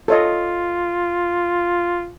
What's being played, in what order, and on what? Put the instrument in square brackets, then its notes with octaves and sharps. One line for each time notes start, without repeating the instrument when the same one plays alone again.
[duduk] F4 [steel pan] A4 C#5 D#5